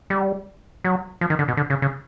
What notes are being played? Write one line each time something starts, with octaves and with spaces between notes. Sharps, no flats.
G3
F#3
F3
D#3
D3
B2
D3
C#3
C#3